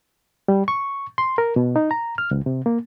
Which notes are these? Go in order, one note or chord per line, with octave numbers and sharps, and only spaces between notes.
G3
C#6
C6
A#4
B2
D#4
A#5
F6
C#2
C3
A#3